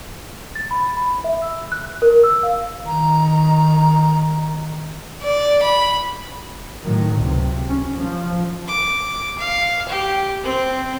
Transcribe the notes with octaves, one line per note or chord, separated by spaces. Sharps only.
A6
B5
B5
E5
E6
F#6
F#6
A#4
E6
F5
D#3 A#5
D5
B5
A2 D#3 F#3
C#2 C3
C#4
F3
D6
F5
G4
C4